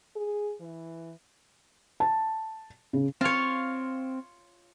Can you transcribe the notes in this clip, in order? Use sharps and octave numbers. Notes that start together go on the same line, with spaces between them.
G#4
E3
A5
C#3
C4 F4 C#5 F5